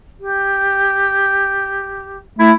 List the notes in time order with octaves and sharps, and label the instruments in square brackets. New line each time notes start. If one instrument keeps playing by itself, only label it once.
[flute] G4
[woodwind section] A3 E4